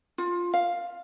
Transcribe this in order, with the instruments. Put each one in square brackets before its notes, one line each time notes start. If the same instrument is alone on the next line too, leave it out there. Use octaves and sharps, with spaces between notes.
[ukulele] F4
F5